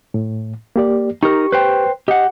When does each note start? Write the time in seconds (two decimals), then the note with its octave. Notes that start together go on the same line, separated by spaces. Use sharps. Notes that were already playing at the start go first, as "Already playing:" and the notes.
0.14 A2
0.76 A#3 G4 D5
1.23 D#4 G4 A#4 C#6
1.52 B4 C5 G5
2.08 G4 D#5 F#5